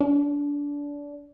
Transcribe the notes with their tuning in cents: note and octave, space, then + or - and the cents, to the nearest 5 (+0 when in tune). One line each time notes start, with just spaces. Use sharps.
D4 -25